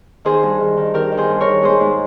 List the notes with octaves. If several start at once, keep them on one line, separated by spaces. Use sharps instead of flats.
D#3 G#4 C5
G2
D#3
D#3
D#3 G4 A#4
D#3
G#4 C5
G2
A#4 C#5
D#3
G#2 G#4 C5
G#2